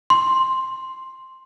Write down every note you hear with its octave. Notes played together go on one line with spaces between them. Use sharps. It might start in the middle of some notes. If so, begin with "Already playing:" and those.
C6